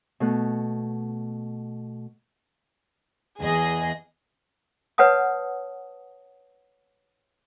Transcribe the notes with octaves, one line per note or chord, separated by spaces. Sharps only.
B2 A3 F#6
E2 G#4 D#5
B4 C#5 F#5 A5 D#6